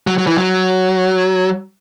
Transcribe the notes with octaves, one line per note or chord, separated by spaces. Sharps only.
F#3
F#3
E3
F#3